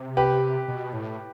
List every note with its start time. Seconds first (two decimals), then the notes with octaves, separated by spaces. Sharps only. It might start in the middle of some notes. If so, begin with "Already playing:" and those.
Already playing: C3
0.17 G4 B4
0.68 B2
0.93 A2